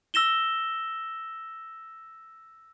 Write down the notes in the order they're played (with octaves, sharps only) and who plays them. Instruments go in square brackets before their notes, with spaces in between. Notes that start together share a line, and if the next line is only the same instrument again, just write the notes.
[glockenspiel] E6 A#6 E7 G7